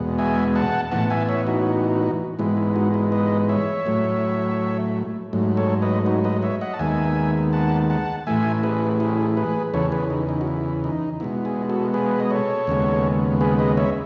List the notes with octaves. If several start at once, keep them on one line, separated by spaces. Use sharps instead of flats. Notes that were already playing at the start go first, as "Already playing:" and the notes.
Already playing: E2 B2 G#3 B3
E5 G#5
F#5 A5
A2 E3 B3 F#5 A5
E5 G#5
C#5 E5
D#4 F#4
G#2 E3 G#3 B3 E4
E4
D#4 F#4
E4
B4 D#5
C#5 E5
A2 F#3 A3
G#2 F#3 A3
A4 C#5
B4 D#5
D#4 F#4
B4 D#5
C#5 E5
D#5 F#5
A5
D#2 D#3 G#3 B3 E5 G#5
F#5 A5
F#5 A5
A2 E3 A3 E5 G#5
G#4 B4
E4 G#4
G#4 B4
E2 C#3 E3 A4 C#5
G#4 B4
D#4
D#4
F#4
E4
D#4
B2 G#3 B3 E4
E4 G#4
F#4 A4
G#4 B4
D#5
A4 C#5
D#2 C#3 G#3 B3
G#4 B4
B4 D#5
C#5 E5